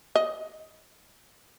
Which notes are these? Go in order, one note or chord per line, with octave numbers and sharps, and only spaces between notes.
D#5